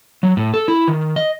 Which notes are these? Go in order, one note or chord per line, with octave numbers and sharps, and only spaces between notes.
F#3
A2
A4
E4
D#3
D#5